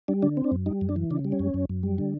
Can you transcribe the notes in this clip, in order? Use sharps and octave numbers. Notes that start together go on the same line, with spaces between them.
G3 D4
D3 D4
C4
D4
F#2
G3 D#4
F#2
D4
E3
C#3 D4
G3
C#4
F#2
F#2
F#2
G3
D3